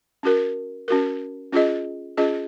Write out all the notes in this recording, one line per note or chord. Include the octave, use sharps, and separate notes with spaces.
C#4 F#4 A#4
C#4 F#4 A#4
C#4 F4 G#4 D#5
C#4 F4 G#4 D#5